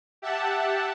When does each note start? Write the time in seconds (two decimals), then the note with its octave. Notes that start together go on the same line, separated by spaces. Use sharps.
0.22 G4 E5 F#5 A5